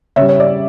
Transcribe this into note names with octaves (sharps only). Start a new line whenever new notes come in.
C#3 G3 C#5 E5
C#5
D5